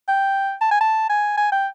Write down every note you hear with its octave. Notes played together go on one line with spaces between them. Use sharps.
G5
A5
G#5
A5
G#5
G#5
G5